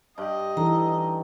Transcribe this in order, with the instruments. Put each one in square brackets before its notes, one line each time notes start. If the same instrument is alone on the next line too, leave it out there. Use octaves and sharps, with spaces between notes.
[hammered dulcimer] G2 G5 [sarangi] D#5
[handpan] E3 D#4 A4 [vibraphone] A#5